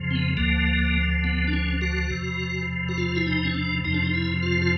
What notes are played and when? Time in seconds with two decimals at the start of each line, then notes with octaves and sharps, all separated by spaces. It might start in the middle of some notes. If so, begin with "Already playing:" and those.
Already playing: F2 C#3 F3
0.11 C4
0.16 B3
0.37 D2 D3 F3 A#3
1.24 B3
1.48 D4
1.53 C#4
1.81 F#4
2.10 E2 C3 F3
2.89 F#4
2.98 F4
3.16 E4
3.27 D#4
3.45 C#4
3.55 D4
3.84 F2 C3 F3 D#4
3.94 D4
4.03 D#4
4.14 E4
4.43 F4
4.62 F4